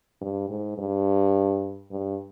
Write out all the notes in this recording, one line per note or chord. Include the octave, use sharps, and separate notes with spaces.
G2
G#2
G2
G2